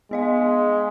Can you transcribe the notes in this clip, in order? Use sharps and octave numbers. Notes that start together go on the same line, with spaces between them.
G#3 B3 D#5 F5